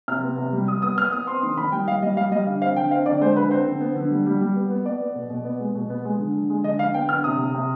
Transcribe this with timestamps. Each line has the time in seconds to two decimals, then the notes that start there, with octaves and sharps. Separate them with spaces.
0.08 C3 F6
0.23 B3
0.38 C3
0.53 G3
0.68 G3 D#6
0.82 B3 D#6
0.97 B3 F6
1.12 B3 D#6
1.27 C4 C6
1.42 D#3 C6
1.57 D#3 B5
1.72 G3 G5
1.87 G3 F5
2.02 G3 D#5
2.16 G3 F5
2.31 G3 D#5
2.47 D3 F5
2.61 C4 F5
2.76 D3 G5
2.91 C4 F5
3.06 D3 D5
3.21 G#3 C5
3.36 D3 B4
3.51 C4 C5
3.66 D3
3.81 B3
3.96 D3
4.10 G3
4.26 G3
4.41 G3
4.56 B3
4.70 B3
4.86 B3 D5
5.01 B3
5.15 B2
5.30 B2
5.45 B3
5.60 G#3
5.75 B2
5.90 B3
6.05 G#3
6.19 D3
6.35 D3
6.50 G#3
6.64 D3 D#5
6.79 D3 F5
6.94 B3 G5
7.09 D3 F6
7.24 C3 D#6
7.39 C3
7.54 C3